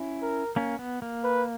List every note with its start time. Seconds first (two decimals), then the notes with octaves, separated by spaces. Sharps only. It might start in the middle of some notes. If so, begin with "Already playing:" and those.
Already playing: C#4 E4
0.22 A#4
0.56 A#3 C#4
0.79 B3
1.02 A#3
1.24 B4